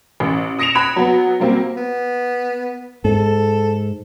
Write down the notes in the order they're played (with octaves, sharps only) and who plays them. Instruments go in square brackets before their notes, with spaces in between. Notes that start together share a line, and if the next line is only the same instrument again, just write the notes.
[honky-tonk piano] A1
D#6 A#6 C#7 D7 E7 F7
B5 F#6 G#6
F#3 B3
F#3 G3 A#3 C4
[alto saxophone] B3
[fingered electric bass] G#2 [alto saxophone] A4